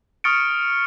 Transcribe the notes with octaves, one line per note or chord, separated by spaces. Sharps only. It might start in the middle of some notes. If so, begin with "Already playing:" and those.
C#6 D#6 F6 A6 C#7 D7